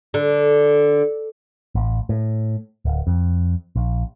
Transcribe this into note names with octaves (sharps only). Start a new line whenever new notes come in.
D3
A1
A2
D1
F2
A#1